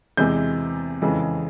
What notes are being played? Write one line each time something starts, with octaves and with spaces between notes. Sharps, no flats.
E2 C3 E3 G#3 G6
F2 C#3 E3 G#3